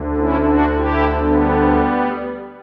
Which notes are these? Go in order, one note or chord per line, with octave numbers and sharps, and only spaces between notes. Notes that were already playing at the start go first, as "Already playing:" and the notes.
Already playing: D2 D3
C#4 E4
D4 F#4
E4 G4
G3 B3